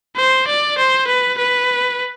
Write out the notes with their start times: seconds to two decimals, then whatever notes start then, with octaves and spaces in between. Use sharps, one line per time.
0.17 C5
0.48 D5
0.78 C5
1.08 B4
1.38 B4